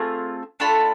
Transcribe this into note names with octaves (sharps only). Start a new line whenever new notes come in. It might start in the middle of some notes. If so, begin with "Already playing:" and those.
Already playing: A3 C4 F4 G#4
A3 D4 F4 B5